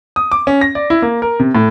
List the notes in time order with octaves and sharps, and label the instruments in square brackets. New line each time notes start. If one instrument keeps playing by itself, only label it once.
[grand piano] D#6
D6
C#4
A#6
D5
E4
A#3
A#4
C3
A2